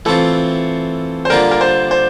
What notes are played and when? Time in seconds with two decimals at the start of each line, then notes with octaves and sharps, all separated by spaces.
0.05 E3 A3 C4 F4 A4
1.25 C5
1.30 D3 G3 A#3 D4 F4 A#4
1.51 A#4
1.61 C5
1.91 C5